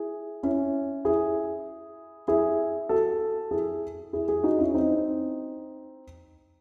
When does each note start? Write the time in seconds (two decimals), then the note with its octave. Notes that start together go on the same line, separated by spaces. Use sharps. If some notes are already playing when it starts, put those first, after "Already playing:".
Already playing: E4 G#4
0.43 C#4 E4
1.05 E4 G#4
2.28 E4 G#4
2.89 F#4 A4
3.51 E4 G#4
4.13 E4 G#4
4.28 E4 G#4
4.43 D#4 F#4
4.58 C#4 E4
4.74 C4 D#4